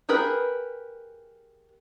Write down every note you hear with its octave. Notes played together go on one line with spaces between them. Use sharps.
G4 G#4 A#4 B4